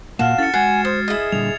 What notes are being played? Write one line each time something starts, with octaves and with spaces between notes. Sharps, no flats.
A#2 A#3 F#4 F5 A5 F6 E7
C#4 E4 A4 A6 C#7
G#3 F#4 F#5 G#5 G#6 C7
C5 D#6
E4 G#4 D#5
A#2 D3 G3 F7